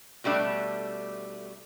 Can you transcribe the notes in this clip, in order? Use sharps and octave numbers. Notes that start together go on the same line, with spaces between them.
B2 G3 A3 D4